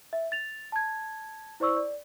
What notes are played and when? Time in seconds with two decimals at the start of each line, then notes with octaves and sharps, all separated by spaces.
0.13 E5
0.32 A6 F7
0.72 A5 G#6
1.60 E4 C5 D5 C#6 E6
1.77 D5